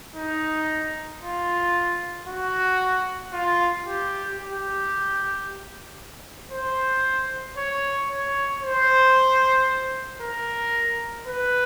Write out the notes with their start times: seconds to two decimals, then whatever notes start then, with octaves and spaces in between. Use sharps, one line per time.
0.16 D#4
1.22 F4
2.28 F#4
3.33 F4
3.86 G4
4.39 G4
6.51 C5
7.57 C#5
8.10 C#5
8.63 C5
10.21 A#4
11.27 B4